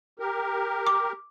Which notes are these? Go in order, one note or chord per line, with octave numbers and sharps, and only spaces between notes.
G4 A#4
D6